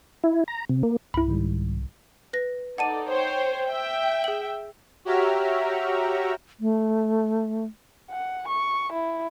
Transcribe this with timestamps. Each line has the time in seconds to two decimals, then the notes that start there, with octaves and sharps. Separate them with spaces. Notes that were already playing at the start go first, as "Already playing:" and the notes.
0.24 E4
0.48 A#5
0.69 C3
0.83 A#3
1.14 C2 G2 E4 B5
1.28 G#2 D#3 G3
2.33 B4 A#6
2.78 D#4 A4 D5 F#5 A5 D#7
3.09 C5 C#5 G5
3.68 E5 G5
4.24 G#4 F#7
5.05 F#4 G4 C#5 E5 A#5 F6
6.60 A3
8.11 F#5
8.48 C#6
8.93 E4